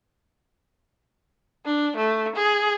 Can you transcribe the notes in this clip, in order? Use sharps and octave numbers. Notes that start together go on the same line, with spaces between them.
D4
A3
G#4